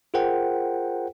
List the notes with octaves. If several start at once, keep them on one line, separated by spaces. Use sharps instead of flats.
F4 G#4 A#4 C5 F#5 G5